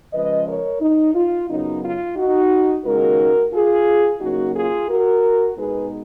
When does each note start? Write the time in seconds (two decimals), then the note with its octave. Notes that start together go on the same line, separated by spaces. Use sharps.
0.13 C#3 F3 G#3 B4 D#5
0.47 A#4 C#5
0.81 D#4
1.15 F4
1.49 F#2 C#3 F#3 B3 D#4
1.83 F4
2.16 D#4 F#4
2.85 D#2 C#3 G#3 D#4 F#4 A#4
3.53 F4 G#4
4.21 C#3 F#3 A#3 D#4 F#4
4.56 F4 G#4
4.89 F#4 A#4
5.57 B2 G#3 B3 D#4 G#4 B4